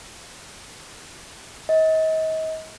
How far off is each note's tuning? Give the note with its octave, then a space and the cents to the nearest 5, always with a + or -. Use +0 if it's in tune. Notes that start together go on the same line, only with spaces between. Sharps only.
D#5 +35